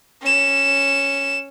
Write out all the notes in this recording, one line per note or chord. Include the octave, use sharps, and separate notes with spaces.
C#4 E7